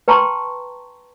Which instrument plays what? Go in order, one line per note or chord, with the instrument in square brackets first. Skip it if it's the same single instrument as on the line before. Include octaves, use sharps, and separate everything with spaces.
[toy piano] B4 G5 A5 A#5 C6 C#6